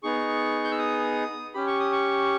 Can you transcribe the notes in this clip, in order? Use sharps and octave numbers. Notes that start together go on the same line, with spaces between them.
B3 D#4 G#4 C#6
G6
E6
D#6
C#4 G4 B5
C#6
D#6
C#6